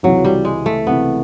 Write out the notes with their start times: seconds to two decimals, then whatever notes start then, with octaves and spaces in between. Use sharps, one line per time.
0.03 C#2 C3 E3 F#3
0.25 G3
0.45 G#3
0.66 A3
0.87 C#2 C3 E3 B3